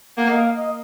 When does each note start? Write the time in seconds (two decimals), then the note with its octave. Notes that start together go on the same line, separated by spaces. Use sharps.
0.17 A#3 F#5
0.29 D#5
0.37 F5
0.56 D#5